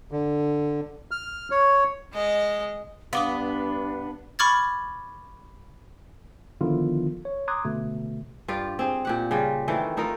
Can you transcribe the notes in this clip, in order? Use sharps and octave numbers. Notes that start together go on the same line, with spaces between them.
D3
F6
C#5
G#3 D#5
G2 B3 D4 F5 D6 D#6
B5 C#6 D6 F6 G#6 A6
D3 D#3 F3 B3 E4 F4
C#5
A#5 C6 D6 D#6 F#6 G#6
B2 D3 A3
G2 F4 G4 D5
C4 G#4
A#2 G4 F#5
C#3 G3 F4
D#3 E3 A3 C4
A3 D#4 F4 A#4